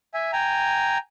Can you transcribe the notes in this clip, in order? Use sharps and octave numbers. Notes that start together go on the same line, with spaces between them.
E5 G#5
G5 G#5 A#5